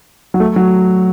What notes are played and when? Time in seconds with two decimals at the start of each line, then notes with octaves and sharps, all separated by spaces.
0.34 F#3
0.40 A3
0.56 F#3